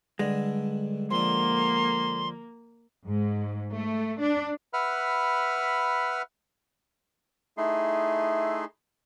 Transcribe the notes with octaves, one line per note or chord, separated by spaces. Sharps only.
G2 D3 G#3
F2 D3 A#3 C6
G#2
A3
D4
B4 E5 F#5 B5 F6
A3 D#4 E4 G#4 C6